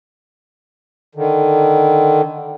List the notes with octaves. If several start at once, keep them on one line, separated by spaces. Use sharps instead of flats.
D3 D#3